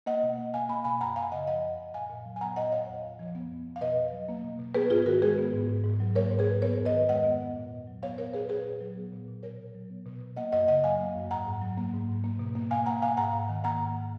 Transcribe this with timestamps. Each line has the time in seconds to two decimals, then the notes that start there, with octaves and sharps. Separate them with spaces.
0.06 A#3 D#5 F#5
0.23 B2
0.38 A#3
0.54 B2 F5 G#5
0.69 A#3 G#5 B5
0.84 B2 G#5 B5
1.01 F#2 F#5 A#5
1.16 F#2 F5 G#5
1.32 C#3 D#5 F#5
1.47 F3 D#5 F#5
1.63 F#2
1.79 F#2
1.94 A#2 F5 G#5
2.10 A#2
2.26 F#3
2.36 G#5
2.41 B3 F#5 A#5
2.56 A#2 D#5 F#5
2.72 A#2 C#5 F5
2.88 F2
3.03 F2
3.19 F3
3.35 B3
3.50 F2
3.66 F2
3.76 F5
3.81 B2 B4 D#5
3.97 B2
4.13 F#3
4.29 A#3
4.44 B2
4.59 B2
4.75 B3 G#4 B4
4.90 G#2 F4 G#4
5.06 D#3 F#4 A#4
5.22 G#3 G#4 B4
5.38 B3
5.53 G#2
5.69 G#2
5.84 G#2
6.00 F#3
6.15 A#3 A#4 C#5
6.31 G#2
6.39 G#4 B4
6.47 G#2
6.62 B3 A#4 C#5
6.78 F2
6.85 B4 D#5
6.93 D#3
7.09 G#3 D#5 F#5
7.24 B3
7.41 F2
7.56 A#2
7.72 A#2
7.87 F#3
8.03 B3 C#5 F5
8.18 A#2 A#4 C#5
8.33 A#2 G#4 B4
8.49 A#2 G#4 B4
8.65 A#2
8.81 F#3
8.97 B3
9.12 A#2
9.28 A#2
9.43 B2 A#4 C#5
9.59 B2
9.75 F#3
9.90 B3
10.06 B2
10.21 B2
10.36 A#3 D#5 F#5
10.52 F#2 D#5 F#5
10.68 C#3 D#5 F#5
10.84 F#3 F5 G#5
11.00 A#3
11.15 F#2
11.31 G#2 F#5 A#5
11.46 G#2
11.62 F#3
11.77 A#3
11.93 G#2
12.09 G#2
12.24 A#3
12.39 B2
12.55 A#3
12.70 B2 F5 G#5
12.86 A#3 F#5 A#5
13.02 B2 F5 G#5
13.17 G#2 F#5 A#5
13.33 G#2
13.49 D#3
13.64 A#3 F#5 A#5
13.80 G#2